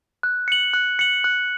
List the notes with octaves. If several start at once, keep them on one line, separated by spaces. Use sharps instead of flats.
F#6
C#7 F#7
F#6
C#7 F#7
F#6